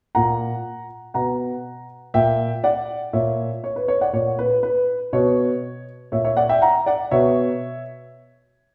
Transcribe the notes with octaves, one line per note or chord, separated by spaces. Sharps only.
A#2 F#5 A#5
B2 F#5 A#5
A#2 E5 G5
D5 F#5
A#2 C#5 E5
C#5
B4
C#5
D5 F#5
A#2 C#5
B4
B4
B2 C#5
A#2 C#5 E5
C#5 E5
D5 F#5
E5 G5
F#5 A#5
D5 F#5
B2 C#5 E5